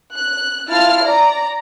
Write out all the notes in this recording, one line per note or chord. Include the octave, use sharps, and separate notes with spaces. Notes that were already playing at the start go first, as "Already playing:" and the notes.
F#6
E4 F4 A5 F6
D5 A#5